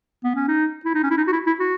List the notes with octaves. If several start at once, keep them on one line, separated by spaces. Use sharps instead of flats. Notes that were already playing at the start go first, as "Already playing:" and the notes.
B3
C#4
D#4
E4
D#4
C#4
E4
D#4
F#4
E4
E4
F#4